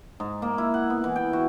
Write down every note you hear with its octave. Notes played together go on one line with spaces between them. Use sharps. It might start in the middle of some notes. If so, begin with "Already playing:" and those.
G#2
A#3
E4
F#5
B3
E3
G5
F#4